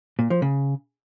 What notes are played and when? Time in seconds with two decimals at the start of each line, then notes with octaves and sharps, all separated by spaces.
0.19 A#2
0.30 F3
0.42 C#3